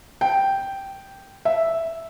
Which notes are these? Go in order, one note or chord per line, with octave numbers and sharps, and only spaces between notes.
G5
E5